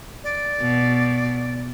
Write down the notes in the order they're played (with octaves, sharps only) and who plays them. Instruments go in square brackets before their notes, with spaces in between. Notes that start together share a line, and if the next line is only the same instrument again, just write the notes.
[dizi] D5
[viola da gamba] B2